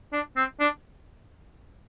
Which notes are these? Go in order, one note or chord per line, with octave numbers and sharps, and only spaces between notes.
D4
C4
D4